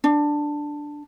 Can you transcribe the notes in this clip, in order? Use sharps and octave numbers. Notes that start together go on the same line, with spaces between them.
D4